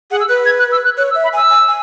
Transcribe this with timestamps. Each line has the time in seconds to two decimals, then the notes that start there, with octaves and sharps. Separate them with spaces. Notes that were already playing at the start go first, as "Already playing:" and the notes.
0.11 G#4 F#5
0.20 E6
0.29 B4 F#6
0.46 G#6
0.59 F#6
0.72 E6
0.85 F#6
0.98 C#5 F#6
1.11 E6
1.15 E5
1.24 B5
1.33 G#5 E6
1.50 G#5
1.67 G#5